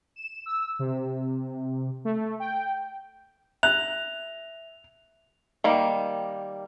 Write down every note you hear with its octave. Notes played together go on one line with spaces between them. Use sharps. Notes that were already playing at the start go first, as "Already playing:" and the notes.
E7
E6
C3
A3
G5
E5 F#6 F7
D#3 G3 A#3